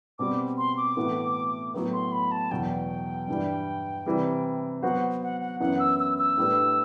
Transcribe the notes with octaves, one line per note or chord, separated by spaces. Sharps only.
B2 G3 C4 D6
C6
D6
A2 E3 B3 F#4 A4
A2 F#3 B3
C6
B5
A5
E2 B2 F#3 G5
G2 E3 G3
C3 E3 G3
F#3 B3 F#4 C5 F#5
F#5
F#5
F#2 E3 B3 E4 F#5
E6
E6
E6
A2 G3 D4 G4 B4